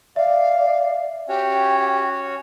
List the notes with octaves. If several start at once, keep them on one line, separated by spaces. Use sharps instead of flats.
D5 E5 F5
C#4 F#4 G4 C#5 G5